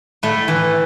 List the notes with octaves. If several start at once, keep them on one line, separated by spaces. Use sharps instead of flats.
A2 A3
E3